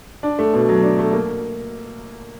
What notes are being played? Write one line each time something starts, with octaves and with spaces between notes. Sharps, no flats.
D4
A3
B2
F#3
D4
A3
A#3